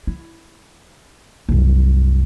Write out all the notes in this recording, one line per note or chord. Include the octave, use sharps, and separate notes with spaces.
E4
C2 F#2